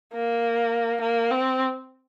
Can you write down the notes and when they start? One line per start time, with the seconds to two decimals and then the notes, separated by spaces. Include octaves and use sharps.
0.13 A#3
1.01 A#3
1.31 C4